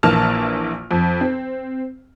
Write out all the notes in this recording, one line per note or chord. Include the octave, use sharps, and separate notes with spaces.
A#1 E3 A#3 A5 F6
F2
C4